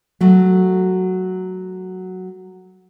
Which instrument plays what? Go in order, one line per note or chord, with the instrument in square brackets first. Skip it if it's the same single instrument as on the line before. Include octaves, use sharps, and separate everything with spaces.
[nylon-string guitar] F#3 A3